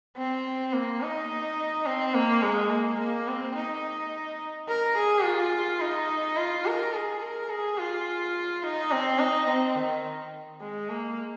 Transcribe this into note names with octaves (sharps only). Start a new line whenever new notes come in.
C4
A#3
D#4
C4
A#3
G#3
A#3
A#3
C4
D#4
A#4
G#4
F4
D#4
F4
A#4
G#4
A#4
G#4
F4
D#4
C4
D#4
C4
D#3
G#3
A#3